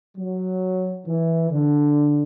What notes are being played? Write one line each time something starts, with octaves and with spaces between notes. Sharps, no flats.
F#3
E3
D3